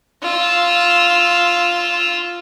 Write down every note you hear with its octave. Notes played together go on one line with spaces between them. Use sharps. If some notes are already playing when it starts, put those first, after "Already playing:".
F4 E6